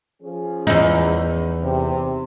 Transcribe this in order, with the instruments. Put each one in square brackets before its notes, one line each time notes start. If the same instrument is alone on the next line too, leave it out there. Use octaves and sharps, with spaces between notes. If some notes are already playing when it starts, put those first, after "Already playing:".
[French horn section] F3 C#4 G#4
[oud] E2 D#4
[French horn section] C3